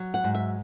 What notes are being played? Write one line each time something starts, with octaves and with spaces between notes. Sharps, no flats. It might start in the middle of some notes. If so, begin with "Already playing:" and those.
Already playing: F#3
F#5
G#2
E5